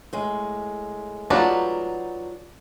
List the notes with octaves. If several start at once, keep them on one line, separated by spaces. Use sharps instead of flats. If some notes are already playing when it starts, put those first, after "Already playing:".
A2 G#3
F#3 D4 D#4 F4 F#4 B4